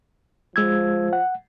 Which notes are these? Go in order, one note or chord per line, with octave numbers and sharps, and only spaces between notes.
F3 G#3 E6 G#6
F#5